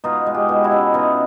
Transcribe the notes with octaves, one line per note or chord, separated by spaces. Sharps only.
B2 D#4 F4
G#3
F4 G4
B2
E4 F#4
C#4
B2 D#4 F4